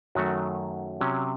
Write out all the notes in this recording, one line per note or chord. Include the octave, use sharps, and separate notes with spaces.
F#2 D#3 F#3 A3 F#4
C3 F#3 C#4